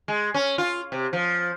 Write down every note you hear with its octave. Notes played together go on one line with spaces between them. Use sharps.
G#3
C#4
F4
C3
F3